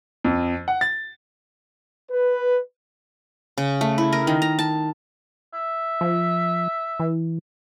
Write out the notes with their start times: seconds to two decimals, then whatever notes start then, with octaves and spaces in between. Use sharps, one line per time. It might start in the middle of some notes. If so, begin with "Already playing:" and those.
0.24 F2
0.68 F#5
0.81 A6
2.10 B4
3.58 C#3
3.81 A3
3.98 E4
4.13 A#4
4.27 D#3
4.42 A#5
4.59 A5
5.54 E5
6.01 F3
7.00 E3